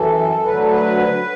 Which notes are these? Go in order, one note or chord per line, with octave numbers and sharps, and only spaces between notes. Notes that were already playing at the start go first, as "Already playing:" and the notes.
Already playing: F#2 E3 A4
D2 D3 F#3 B4
A4
B4